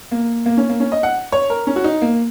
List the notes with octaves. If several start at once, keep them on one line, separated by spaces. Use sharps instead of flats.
A#3
A#3
C#4
A#3
C#4
D#5
F#5
C#5
A#4
C#4
F#4
D#4
A#3